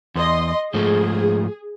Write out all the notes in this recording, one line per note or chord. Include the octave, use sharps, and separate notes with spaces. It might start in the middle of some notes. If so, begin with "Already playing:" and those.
E2 D#5 C6
G#2 F3 A3 G#4